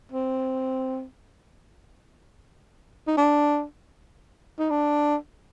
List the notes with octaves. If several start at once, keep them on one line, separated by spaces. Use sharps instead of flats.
C4
D#4
D4
D#4
D4